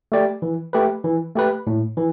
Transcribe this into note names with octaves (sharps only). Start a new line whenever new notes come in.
A3 G4 D5
E3
A3 G4 B4
E3
A3 G4 B4
A2
E3